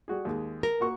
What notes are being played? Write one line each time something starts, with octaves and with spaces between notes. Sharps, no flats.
G3 F#4 G#4
D#2 G#3
A#4
A#3 F#4 C#6